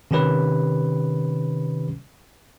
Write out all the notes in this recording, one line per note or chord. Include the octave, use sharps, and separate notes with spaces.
C3 D#3 C#4 G4 B4